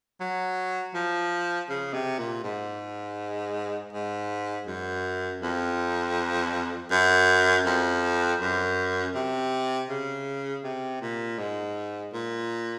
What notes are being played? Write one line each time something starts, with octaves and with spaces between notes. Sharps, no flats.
F#3
F3
C#3
C3
A#2
G#2
G#2
F#2
F2
F#2
F2
F#2
C3
C#3
C3
A#2
G#2
A#2